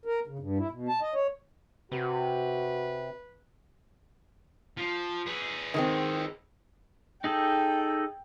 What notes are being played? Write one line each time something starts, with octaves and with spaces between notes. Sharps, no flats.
A#4
C#3
G2
E4
B2
A5
D#5
C#5
C3 F#4 B4
F3
G#4 B4
D#3 G#3 C4
D#4 G#4 A4 G5